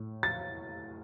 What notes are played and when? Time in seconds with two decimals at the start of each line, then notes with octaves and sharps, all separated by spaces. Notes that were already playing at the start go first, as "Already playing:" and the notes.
Already playing: A2
0.23 A6